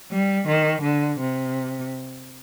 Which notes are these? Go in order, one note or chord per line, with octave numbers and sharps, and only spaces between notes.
G3
D#3
D3
C3